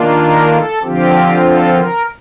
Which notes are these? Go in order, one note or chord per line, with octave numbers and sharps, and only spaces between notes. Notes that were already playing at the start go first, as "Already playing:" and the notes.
Already playing: D#3 A#3 D4 F4
A#4
A4
D3 F3 C4 F4 G4
A4
A#4